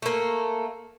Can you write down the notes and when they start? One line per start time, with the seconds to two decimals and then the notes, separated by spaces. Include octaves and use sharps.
0.02 A3 A#3